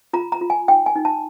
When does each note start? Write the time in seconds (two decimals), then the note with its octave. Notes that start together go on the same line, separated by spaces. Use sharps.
0.13 F4 A#5
0.32 A#5
0.41 F4
0.50 G#5
0.68 D#4 G5
0.86 G#5
0.95 D#4
1.05 A5